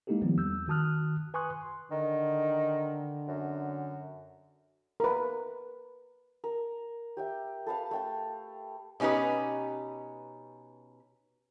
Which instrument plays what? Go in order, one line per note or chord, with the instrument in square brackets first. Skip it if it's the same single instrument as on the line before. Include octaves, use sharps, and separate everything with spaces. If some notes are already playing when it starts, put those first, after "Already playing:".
[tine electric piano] G#3 A#3 D#4 E4 G4 A4
D#3 F3 G3 B3 C4
E2 E6 G6
D#3 F#4 A5 D#6 F6 F#6
B4 G#5 C6 C#6 D#6 F#6
C6
[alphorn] D3 [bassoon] D#3
[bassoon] F#2
[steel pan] A#4 B4
[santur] A#4
G4 E5 G5
A4 B4 F5 A5
A3 G5 A5
[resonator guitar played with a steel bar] B2 C#4 D#4 G4 B4